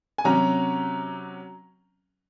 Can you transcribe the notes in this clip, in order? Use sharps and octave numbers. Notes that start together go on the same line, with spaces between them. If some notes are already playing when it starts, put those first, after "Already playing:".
G#5
C3 F#3 C#4 A#5